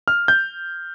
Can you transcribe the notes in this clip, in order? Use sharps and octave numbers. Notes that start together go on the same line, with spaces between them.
F6
G6